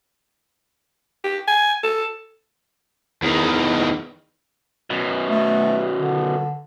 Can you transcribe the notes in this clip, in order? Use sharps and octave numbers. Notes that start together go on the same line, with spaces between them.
G4
G#5
A4
E2 D#3
F#2 B2
A3
D3